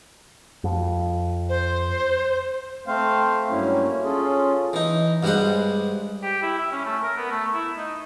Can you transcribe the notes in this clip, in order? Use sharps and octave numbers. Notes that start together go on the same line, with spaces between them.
F2
C5
A3 C4 C5 F5
G2 F#3 A3 A#3 C#4 E4
C#4 F4 G#4 A4
E3 D#4
G2 G3 G#3 C5 F#5
G4
E4
E5
C#4
A3
A#4
B3
A3
E4
D#4